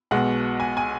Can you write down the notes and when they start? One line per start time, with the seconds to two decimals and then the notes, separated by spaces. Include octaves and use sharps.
0.11 B1 B2 G#3 F#5
0.60 G#5
0.77 G#5